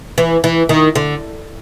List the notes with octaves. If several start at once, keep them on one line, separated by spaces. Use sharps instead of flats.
E3
E3
D#3
D3